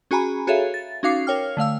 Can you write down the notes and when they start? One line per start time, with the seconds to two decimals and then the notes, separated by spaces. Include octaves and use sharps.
0.11 C#4 F#4 G#4 G#5 A#5 B5
0.47 F#4 G#4 A4 C#5 E5 F5
0.74 A6
1.03 C#4 D#4 F#4 F5 D6 C7
1.27 A#4 C#5 G5 F6
1.57 D3 A3 F5 E6